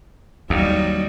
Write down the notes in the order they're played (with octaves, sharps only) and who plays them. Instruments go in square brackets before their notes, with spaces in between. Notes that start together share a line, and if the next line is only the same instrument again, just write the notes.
[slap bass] D#2 [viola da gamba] F#3 G3 D#4